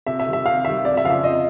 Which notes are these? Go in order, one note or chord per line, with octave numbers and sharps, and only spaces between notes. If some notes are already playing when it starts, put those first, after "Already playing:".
C3 E5
E5
D#3 G3
E5
C3 F5
D#3 G3 E5
F2 D5
E5
C#3 F3 F5
E5
F2 D#5